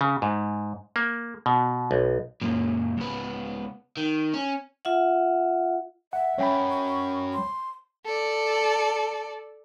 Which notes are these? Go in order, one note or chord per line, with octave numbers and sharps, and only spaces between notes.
C#3
G#2
A#3
B2
B1
F#2 A#2
C#2 B3
D#3
C#4
F4 E5 F#5
E5 F#5
F#2 C#5 G5 B5
C#6
C6
A4 D5